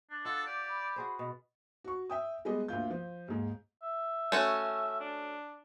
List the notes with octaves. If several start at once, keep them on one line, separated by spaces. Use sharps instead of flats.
D4
F4 A4 F#5
G4 D5
B5
F#4 G#4 C5
B2
F#4 C#6
E5 G5 D#6
G3 G#3 B3 G4 G#4 D#5
D2 A#3 F4 G6
F3
D#2 G#2
E5
A3 C#4 F#4
D4